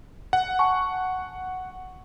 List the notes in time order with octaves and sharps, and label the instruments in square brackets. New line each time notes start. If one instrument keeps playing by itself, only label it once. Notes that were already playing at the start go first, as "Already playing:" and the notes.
[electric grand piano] F#5
[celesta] G#5 A5 C#6